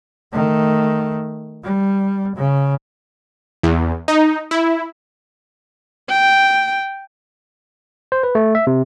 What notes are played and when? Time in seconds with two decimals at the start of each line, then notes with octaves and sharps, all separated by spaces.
0.33 D#3 A3
1.64 G3
2.36 C#3
3.63 E2
4.08 D#4
4.51 E4
6.10 G5
8.12 C5
8.23 B4
8.35 A3
8.55 E5
8.67 C3